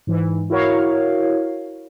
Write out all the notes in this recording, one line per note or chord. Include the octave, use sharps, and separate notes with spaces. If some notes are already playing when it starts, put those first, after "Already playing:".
G#2 E3
E4 F#4 A#4 C#5 F5